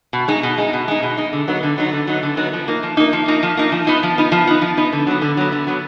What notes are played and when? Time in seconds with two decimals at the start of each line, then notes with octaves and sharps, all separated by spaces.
0.13 B2
0.28 G#3 D#4
0.43 B2
0.58 G#3 D#4
0.73 B2
0.88 G#3 D#4
1.03 B2
1.17 G#3 D#4
1.33 D3
1.48 F#3 B3 D#4
1.63 D3
1.78 F#3 B3 D#4
1.93 D3
2.07 F#3 B3 D#4
2.23 D3
2.37 F#3 B3 D#4
2.53 F3
2.68 A#3 D#4
2.83 F3
2.97 A#3 D#4
3.13 F3
3.28 A#3 D#4
3.43 F3
3.57 A#3 D#4
3.72 F3
3.87 B3 D#4
4.03 F3
4.18 B3 D#4
4.32 F3
4.47 B3 D#4
4.62 F3
4.77 B3 D#4
4.93 D3
5.07 F#3 B3
5.22 D3
5.37 F#3 B3
5.52 D3
5.67 F#3 B3